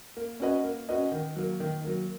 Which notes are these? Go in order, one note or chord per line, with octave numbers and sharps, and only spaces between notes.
A#3
C#4 F#4 B4 D#5
A#3
C#4 F#4 B4 D#5
D#3
F#3 A#3
D#3
F#3 A#3